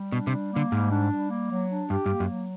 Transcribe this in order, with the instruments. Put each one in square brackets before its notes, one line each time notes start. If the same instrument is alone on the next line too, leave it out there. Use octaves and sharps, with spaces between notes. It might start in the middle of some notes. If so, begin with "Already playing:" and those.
Already playing: [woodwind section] G3
[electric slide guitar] B2 [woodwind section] D4
[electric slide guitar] C3
[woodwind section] G3
[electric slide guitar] D3 [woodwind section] A#3
[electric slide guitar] G#2 [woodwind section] G3
[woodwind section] D4
G3
A#3
F#3
D4
[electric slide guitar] G2 [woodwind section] G4
[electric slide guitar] G2
[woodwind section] A#3
[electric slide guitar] F#2
[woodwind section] F#3